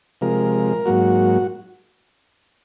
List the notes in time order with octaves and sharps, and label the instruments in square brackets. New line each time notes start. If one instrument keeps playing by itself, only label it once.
[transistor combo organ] C3 F3 G#3 A#4
G#2 F#3 A#3 F#4